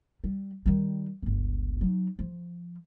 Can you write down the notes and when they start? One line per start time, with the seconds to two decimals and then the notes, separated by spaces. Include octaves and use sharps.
0.24 G3
0.66 D#3 G3
1.22 G1 C#2
1.81 F#3 D#4
2.19 F3